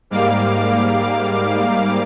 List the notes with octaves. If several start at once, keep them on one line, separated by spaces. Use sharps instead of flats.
G#2 G3 A#3 F5 D6